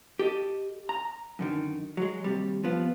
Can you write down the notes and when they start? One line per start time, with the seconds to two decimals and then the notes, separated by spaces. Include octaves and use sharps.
0.19 G4 A4 D#5
0.89 A#5
1.39 F#2 D3 D#3
1.97 F#3 G#3
2.24 D#2 C3 G3
2.64 F3 B3 F4